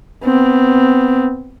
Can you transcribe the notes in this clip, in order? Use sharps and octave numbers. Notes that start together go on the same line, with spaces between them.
B3 C4